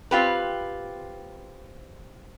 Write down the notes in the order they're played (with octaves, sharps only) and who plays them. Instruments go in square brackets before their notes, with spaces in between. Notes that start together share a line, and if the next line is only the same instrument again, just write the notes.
[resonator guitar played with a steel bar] C4 F4 G4 B4